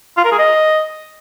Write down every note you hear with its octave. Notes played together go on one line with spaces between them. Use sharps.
F4
A#4
G#4
D#5